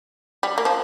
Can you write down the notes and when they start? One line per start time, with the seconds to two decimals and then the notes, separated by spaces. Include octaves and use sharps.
0.43 G3
0.58 A#3
0.65 F3